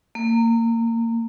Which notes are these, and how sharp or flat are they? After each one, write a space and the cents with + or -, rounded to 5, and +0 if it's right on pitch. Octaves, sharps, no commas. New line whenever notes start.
A#3 -25